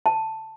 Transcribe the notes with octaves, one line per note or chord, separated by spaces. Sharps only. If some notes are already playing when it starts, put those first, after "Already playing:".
A5